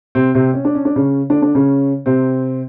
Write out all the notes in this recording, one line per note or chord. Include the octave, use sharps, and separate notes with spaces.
C3 C4
C3 C4
C#4
D4
C#4
D4
C#3 C#4
D3 D4
D3 D4
C#3 C#4
C3 C4